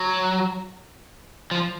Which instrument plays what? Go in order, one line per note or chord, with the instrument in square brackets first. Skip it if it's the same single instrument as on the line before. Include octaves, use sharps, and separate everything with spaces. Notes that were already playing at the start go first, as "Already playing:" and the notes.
Already playing: [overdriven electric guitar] F#3
F3